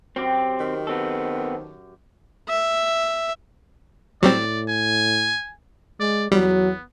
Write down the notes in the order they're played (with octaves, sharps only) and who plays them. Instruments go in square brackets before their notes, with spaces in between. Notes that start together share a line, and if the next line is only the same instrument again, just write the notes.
[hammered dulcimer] F#2 F#4 G4 [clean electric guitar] C4
[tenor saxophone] D#3
[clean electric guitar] B3 C4 A4
[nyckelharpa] E5
[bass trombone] A2 [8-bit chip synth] F#3 G3 C4 [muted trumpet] D5
[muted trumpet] G#5
[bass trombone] G#3 [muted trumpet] D5
[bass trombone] E2 [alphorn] F#3 [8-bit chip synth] G3 [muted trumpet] B3